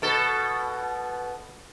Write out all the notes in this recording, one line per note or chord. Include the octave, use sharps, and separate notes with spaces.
B2 A4